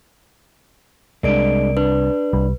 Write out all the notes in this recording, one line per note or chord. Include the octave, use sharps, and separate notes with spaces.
C2 G#3 D4 A#4 D5 D7
D4 B4
C2 G3